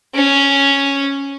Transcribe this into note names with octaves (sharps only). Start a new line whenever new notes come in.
C#4